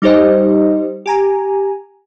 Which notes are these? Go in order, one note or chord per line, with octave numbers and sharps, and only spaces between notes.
G3 D#4 G4 C5 D#5
G4 G#5 A#5